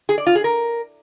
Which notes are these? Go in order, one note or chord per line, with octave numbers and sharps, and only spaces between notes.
G#4
D5
F4
G#4
A#4